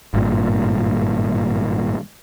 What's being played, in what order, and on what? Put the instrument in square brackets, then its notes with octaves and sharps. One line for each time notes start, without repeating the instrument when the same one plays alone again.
[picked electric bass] G#1 G2 A#2